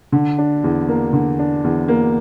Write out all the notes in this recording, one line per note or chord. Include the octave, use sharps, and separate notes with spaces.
D3
D4
E2
A#3
D3
D4
E2
A#3